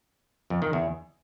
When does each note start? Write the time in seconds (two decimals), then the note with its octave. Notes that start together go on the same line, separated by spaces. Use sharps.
0.50 F2
0.62 D#3
0.73 E2